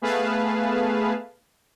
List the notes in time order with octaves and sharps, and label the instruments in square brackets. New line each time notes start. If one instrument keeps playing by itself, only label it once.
[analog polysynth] A3 B3 G#4 B4 F5 A5